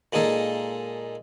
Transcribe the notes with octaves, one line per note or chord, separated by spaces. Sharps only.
A#2 G#3 A#3 D#4 G#4 A4